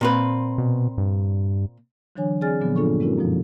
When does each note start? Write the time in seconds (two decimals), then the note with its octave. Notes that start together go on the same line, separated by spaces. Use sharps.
0.01 A#2 C4 B4
0.58 B2
0.98 G2
2.16 D3 E3 F#3 D4 C#5 G#5
2.41 C4 G#4 D5 G#5 F6 A6
2.61 A#2 D3 F3 F#3 B3
2.76 G2 A#3 D4 F4 A4 C#6
3.00 G#3 C4 C#4 E4 F#4 A#4
3.18 F#2 B2 F3